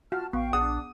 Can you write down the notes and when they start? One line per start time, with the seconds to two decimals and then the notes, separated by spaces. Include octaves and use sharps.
0.12 F4 F#4 F5 A5 F6
0.33 A1 B3 F5 G5 C#6
0.53 A#1 D4 G#4 F#5 D#6